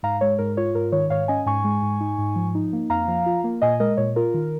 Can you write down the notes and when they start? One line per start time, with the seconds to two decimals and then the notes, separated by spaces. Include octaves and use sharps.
0.03 G#2 F5 A#5
0.21 G#3 C#5
0.39 G#2 A#4
0.57 F4 C#5
0.75 G#2 A#4
0.92 D#3 C#5
1.10 G#2 C#5 F5
1.28 C#4 D#5 G#5
1.46 G#2 G#5 C#6
1.64 G#3
1.82 G#2
2.01 D#4
2.18 G#2
2.36 F3
2.55 D#4
2.73 A#3
2.90 F2 F5 A#5
3.08 F3
3.26 F4
3.44 A#3
3.62 A#2 D#5 G#5
3.80 G#3 A#4 D#5
3.97 A#2 C#5
4.16 F4 A#4
4.34 D#3